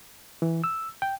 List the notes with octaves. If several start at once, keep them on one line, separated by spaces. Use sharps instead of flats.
E3
E6
G5